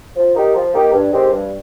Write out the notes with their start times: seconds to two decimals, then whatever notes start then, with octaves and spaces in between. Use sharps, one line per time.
0.16 F3
0.35 A#3 D#4 G4
0.55 F3
0.74 A#3 D#4 G4
0.93 G2
1.12 D#3 G#3 C4 G4
1.31 G2